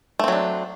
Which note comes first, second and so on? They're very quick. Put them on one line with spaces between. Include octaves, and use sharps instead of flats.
A3 C4 F#3 D4